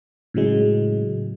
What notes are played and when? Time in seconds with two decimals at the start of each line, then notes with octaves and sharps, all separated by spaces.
0.34 A2 C#3 F#3 G#3